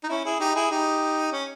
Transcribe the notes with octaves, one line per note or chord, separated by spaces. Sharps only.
D#4
C#4 E4
E4 G#4
D#4 G4
E4 G#4
D#4 G4
C#4